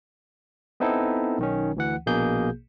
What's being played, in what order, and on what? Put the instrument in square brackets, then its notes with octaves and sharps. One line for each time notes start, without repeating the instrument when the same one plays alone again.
[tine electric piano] B3 C4 D#4 E4 A4
B1 D#3 C#4
D2 E3 F#5
A#1 B2 A#3 G#4 G6